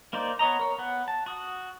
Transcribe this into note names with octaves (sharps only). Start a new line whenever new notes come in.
A#3 D#4 C5 D5
B3 C#5 D#5 A#5
A#4 C#5
B3 F#5
A5
F#4 D#6